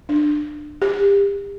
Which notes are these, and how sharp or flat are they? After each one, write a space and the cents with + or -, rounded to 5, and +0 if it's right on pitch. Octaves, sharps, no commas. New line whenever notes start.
D4 +25
G4 +35